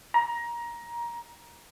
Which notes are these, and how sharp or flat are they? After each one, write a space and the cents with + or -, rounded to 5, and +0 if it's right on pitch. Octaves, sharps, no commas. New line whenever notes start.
A#5 +20